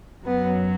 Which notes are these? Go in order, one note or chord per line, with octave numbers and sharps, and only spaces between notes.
F#2 F#3 B3